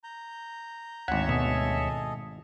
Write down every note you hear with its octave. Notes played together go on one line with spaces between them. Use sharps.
A#5 G6
G#1 D2 C#5 E5 F#5
B2 G#4 A4 D#5